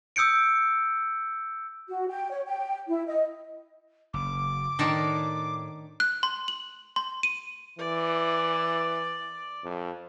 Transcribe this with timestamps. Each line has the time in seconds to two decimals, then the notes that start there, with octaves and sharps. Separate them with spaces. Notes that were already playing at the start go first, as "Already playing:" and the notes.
0.16 D#6 E6 G6 C#7 D7
1.88 F#4
2.09 G5
2.31 C#5
2.47 G5
2.88 E4
3.07 D#5
4.14 F#1 D6
4.79 A2 D#3 D4 D#4
6.00 F#6
6.23 C6
6.48 F#7
6.96 C6
7.23 D#7
7.79 E3 D5
9.64 F2